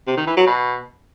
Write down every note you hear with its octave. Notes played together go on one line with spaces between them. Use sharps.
C3
D#3
E3
F#3
B2